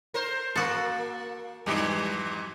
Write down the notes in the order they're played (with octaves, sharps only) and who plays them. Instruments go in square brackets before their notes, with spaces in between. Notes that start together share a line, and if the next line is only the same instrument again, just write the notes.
[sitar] A#4 C5
[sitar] A#3 [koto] F#4 A4 [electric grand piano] C#7
[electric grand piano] F2 G#2 E3 [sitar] F#3